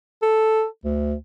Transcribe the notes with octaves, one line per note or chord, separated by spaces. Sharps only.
A4
D2